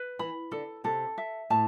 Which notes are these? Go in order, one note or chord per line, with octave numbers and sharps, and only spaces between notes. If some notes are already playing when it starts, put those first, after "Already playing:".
Already playing: B4
E3 B5
D3 A4
C3 A4
E5
A2 A5